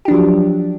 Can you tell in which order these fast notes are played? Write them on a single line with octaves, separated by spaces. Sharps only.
G4 D4 F3 F#3